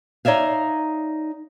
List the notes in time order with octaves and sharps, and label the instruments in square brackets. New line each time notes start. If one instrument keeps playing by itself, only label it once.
[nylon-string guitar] D#4 C#5 D5 E5 F5